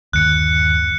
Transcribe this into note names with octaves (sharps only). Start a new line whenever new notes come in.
G1 D#2 F#6 C#7